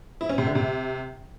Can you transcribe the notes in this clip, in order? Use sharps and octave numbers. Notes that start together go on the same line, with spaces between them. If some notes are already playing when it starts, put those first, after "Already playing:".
E4
C#4
C3
D3
C3